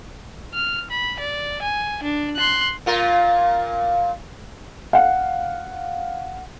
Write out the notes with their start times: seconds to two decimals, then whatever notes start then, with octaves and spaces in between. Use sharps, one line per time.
0.54 F6
0.91 B5
1.20 D5
1.62 G#5
2.03 D4
2.36 C6 F#6
2.86 A#2 F4 A#4
4.93 F5 F#5